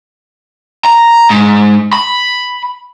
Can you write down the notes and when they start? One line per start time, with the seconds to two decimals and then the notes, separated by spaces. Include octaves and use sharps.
0.85 A#5
1.30 G#2
1.93 B5